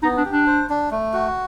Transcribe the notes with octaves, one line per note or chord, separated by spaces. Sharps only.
B3 D#4
D4
G4
D4
C5
D4
A3
F#4